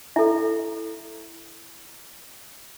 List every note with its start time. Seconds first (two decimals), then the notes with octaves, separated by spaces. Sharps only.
0.16 E4 A4 E5